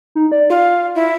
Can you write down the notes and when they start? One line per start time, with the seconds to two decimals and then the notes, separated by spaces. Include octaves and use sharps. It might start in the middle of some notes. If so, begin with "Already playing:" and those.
0.15 D#4
0.32 D5
0.50 F4 F5
0.95 E4